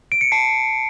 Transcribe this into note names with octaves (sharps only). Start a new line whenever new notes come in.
D7
C#7
A5 C7